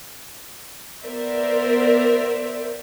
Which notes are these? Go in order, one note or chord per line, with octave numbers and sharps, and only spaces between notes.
B3 A#4 C5 D5 E5